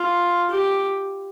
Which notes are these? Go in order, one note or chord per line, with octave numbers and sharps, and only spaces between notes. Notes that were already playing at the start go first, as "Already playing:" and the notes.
Already playing: F4
G4